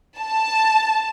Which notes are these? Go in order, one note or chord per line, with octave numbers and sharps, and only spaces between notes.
A5